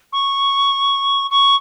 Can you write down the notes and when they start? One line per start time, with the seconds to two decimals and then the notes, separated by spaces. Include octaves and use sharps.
0.12 C#6
1.30 C#6